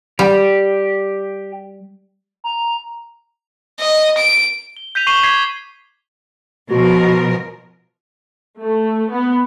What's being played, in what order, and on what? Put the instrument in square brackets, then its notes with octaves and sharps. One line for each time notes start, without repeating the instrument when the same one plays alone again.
[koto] G3 [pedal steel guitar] G4
[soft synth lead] A#5
[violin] D#5
D7
[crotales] G7
G6 B6 D#7 F7
C#6 C7 D#7 E7 F#7 G7
D6 G#6 B6 C7
[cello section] B2 F3 A#4 [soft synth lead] F#4
[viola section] A3
B3